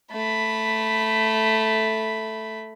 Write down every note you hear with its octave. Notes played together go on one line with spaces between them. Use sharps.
A3 B5